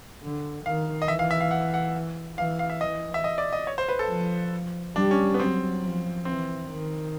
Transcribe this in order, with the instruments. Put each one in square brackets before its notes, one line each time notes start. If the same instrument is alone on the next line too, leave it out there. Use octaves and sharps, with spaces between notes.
[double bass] D3
[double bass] D#3 [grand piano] F5
[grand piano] D#5
[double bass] E3 [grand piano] E5
[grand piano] F5
E5
F5
F#5
F#5
[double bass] E3 [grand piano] F5
[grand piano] F5
E5
[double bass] E3 [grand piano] D#5
[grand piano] E5
D#5
D5
D#5
C#5
C5
B4
A4
[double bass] F3
[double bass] G3 [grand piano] D4
[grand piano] C#4
B3
[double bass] F#3 [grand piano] C4
[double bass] F3
[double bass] E3 [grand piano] C4
[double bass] D#3